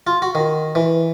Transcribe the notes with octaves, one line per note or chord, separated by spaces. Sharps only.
F4
F#4
D#3
E3